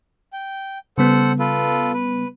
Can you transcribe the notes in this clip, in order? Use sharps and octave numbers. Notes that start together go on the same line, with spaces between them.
G5
C#3 G3 B3 A4 C5 F#5
F4 A4 B4
B4